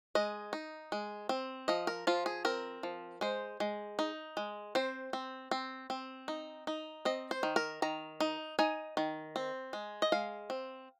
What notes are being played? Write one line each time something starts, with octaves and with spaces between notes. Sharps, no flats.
G#3 D#5
D#4
G#3
C4
F3 D#5
A#4
F3 F4
G#4
C4 A#4
F3
G#3 C5
G#3
D#4
G#3
C4 C5
C4
C4
C4
D#4
D#4
C4 D#5
C5
D#3
A#4
D#3 A#5
D#4
D#4 G#5
D#3
C4
G#3
D#5
G#3 F5
C4